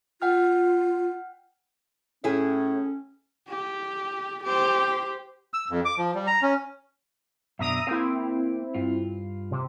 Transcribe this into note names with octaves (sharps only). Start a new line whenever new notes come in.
F4 F#5 G5 F6
A2 C#4 E4 G#4
G4
G4 C5
E6
F2
D6
F3
G3
A#5
C#4
F#2 B2 D4 E5 A#5 D#6
A#3 C4 E4 A#4 F5
G2 F4
C3